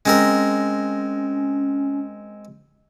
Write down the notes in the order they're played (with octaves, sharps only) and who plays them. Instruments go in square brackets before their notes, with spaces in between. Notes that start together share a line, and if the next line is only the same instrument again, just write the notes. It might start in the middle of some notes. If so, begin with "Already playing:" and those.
[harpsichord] G#3 C4 A#4 [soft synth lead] C#4